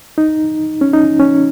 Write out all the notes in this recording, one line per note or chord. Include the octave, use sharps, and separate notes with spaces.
D#4
C#4
D#4
C#4